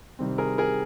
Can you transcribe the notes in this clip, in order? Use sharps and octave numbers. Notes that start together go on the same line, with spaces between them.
C3 D#3 G3 C4
G#4 A#4
G#4 A#4